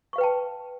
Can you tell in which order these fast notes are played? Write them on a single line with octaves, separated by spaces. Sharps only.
C#6 F5 B4 G5 A5